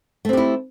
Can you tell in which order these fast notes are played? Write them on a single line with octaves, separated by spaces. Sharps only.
A3 C4 G4 E4